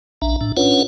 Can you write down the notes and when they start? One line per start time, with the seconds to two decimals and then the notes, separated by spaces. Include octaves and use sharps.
0.22 A#1 D4 E5 A#5
0.41 A2 D4
0.57 C#4 D4 F4 B4 C#5 F#5